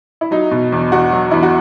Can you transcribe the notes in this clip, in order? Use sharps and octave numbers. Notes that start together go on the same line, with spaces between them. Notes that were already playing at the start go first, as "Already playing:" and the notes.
E4
F#3 D#4
B2
E2
E2 F#4
F#3
E2 E4
F#4